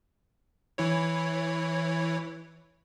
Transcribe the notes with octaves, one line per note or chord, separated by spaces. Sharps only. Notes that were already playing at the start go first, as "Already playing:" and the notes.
E3 E4 C#5